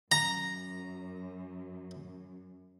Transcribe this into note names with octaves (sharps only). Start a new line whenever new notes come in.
F#2 A#5